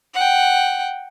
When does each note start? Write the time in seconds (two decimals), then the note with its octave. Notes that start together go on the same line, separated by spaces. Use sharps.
0.14 F#5 G5